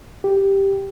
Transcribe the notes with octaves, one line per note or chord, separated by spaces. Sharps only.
G4